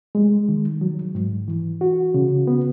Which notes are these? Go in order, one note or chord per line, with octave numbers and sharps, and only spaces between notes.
G#3
D#3
F#3
G#2
E3
F#4
C#3
B3